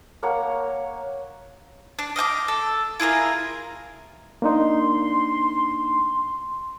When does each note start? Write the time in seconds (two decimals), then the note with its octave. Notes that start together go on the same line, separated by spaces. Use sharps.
0.23 A#3 C#5 F#5 A#5
1.99 D4
2.16 D#5 F5 G5 D6
2.48 A4
3.00 E4 F4 G#4 A#4
4.42 A#3 D4 D#4 C6